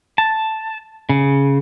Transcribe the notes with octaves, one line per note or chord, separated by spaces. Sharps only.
A5
C#3